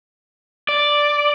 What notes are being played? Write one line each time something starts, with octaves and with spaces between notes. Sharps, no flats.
D5